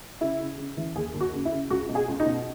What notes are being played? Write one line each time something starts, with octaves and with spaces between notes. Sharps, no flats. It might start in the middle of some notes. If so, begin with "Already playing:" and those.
C#3 E4
C#3
C#3
E3
D#2 G#4
D#2
F#4
C#3
E4
C#3
C#2 F#4
B2
G#4
C#2
D#4
B2